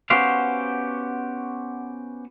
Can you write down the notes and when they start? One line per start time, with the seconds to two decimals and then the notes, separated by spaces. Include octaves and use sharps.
0.10 B3 C#4 F#4 G4 C5 F5